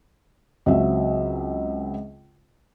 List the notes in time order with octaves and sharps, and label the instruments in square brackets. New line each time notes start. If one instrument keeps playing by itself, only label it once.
[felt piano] C#2 F#3 C4 E5